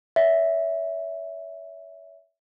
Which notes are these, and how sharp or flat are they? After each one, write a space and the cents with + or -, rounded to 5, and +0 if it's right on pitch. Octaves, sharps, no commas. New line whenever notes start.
C#5 +35 E5 +0